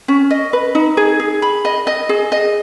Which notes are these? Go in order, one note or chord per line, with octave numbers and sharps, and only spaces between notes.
C#4
D#5
B4
D#4
G#4
G#4
B5
D#5
D#5
G#4
D#5